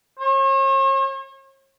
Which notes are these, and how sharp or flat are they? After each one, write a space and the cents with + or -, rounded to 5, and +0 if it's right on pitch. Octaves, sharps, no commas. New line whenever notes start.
C#5 -45